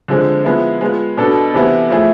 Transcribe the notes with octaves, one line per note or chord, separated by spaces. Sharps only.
D3 F3 G#3 C4
F3 G#3 B3 E4
G#3 B3 F4
B2 B3 D4 A4
C3 E3 B3 E4
F3 A3 E4 G#4